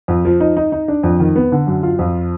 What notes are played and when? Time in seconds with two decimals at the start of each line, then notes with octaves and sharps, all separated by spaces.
0.08 F2
0.25 F3
0.40 D#4
0.57 D#4
0.72 D#4
0.88 D4
1.03 F2
1.20 D#3
1.36 B3
1.52 D3
1.67 F#2
1.83 F4
1.99 F2